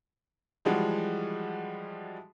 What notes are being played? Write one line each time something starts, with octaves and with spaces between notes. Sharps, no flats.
E3 F3 G3 G#3 F#4